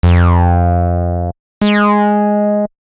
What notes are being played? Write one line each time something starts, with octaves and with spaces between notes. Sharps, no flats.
F2
G#3